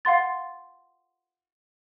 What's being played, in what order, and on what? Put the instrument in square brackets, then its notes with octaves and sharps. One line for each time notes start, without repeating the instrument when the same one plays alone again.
[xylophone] F5 F#5 C6 A6